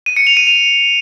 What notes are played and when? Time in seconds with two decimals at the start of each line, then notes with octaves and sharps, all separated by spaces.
0.06 D#7
0.17 C#7
0.27 F7
0.37 D#7
0.47 F7